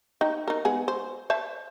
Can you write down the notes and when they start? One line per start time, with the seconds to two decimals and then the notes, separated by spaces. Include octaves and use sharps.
0.21 D#4 G5
0.48 D#4 A#4
0.65 G#3 B3 G#4
0.88 C5
1.30 C5 E5 A5